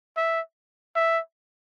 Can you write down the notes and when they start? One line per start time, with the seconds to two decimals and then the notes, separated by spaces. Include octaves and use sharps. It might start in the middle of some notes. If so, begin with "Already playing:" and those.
0.17 E5
0.96 E5